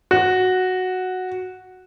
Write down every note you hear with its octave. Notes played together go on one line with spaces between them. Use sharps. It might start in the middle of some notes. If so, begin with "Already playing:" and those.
F#4